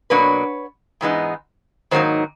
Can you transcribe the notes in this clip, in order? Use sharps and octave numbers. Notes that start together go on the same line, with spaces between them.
B2 F#3 A#3 D4 B4 C#5
G#2 E3 G#3 B3 D#4
G#2 D#3 F#3 A#3 D#4 C5